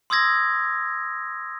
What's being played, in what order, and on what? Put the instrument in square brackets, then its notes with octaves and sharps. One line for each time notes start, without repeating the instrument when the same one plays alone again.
[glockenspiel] C6 D#6 E6 G#6 A#6